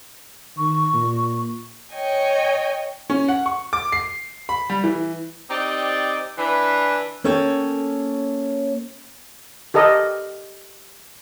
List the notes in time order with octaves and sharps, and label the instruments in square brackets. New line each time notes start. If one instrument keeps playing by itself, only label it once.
[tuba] D#3 [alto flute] C#6
[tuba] A#2
[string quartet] C#5 D#5 G5 G#5
[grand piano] C#4
F#5
C#6
D6
C7
B5
G3
E3
[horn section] C4 D#4 G4 D5
E3 D4 B4
[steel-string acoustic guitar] A#3 C#4 A4 C#5 G5
[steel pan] G4 A4 A#4 D#5